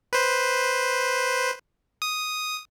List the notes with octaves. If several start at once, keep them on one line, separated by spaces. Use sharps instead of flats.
B4 C5
D#6